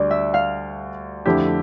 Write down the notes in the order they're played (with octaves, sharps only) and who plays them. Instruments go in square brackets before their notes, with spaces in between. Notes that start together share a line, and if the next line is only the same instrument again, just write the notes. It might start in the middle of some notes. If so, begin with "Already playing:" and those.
Already playing: [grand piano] D2 D3 G3 [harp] D5
[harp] E5
F5
[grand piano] F2 D3 A3 E4 G4